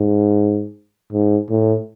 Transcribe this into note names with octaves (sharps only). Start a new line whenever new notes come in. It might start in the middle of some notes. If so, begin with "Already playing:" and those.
Already playing: G#2
G#2
A2